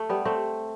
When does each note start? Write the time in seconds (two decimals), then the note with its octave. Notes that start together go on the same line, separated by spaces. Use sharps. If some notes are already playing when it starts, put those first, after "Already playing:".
Already playing: A3
0.09 G3 B3
0.25 A3 C4